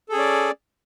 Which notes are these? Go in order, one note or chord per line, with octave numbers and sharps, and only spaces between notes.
C#4 G#4 A4 D5